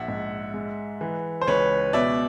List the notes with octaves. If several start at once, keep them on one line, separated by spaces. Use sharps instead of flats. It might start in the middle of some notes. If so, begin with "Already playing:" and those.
Already playing: A#1 E5 F#5
G#2
G#3
E3
C5
C#2 B4 C#5
B2 D5 E5